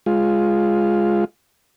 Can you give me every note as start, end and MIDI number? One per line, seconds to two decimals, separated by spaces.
0.06 1.25 56
0.06 1.25 65